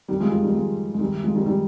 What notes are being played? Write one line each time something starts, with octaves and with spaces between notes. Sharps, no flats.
D#3 G3
F3 G#3
F3 G#3
D#3 G3
F3 G#3
G#3
D#3 G3
F3 G#3
D#3 G3
D#3 G3